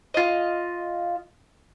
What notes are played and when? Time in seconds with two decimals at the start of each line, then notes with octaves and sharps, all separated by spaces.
0.14 F4 D#5